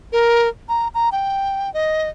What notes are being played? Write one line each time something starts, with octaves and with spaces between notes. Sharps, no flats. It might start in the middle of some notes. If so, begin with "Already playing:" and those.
A#4
A#5
A#5
G5
D#5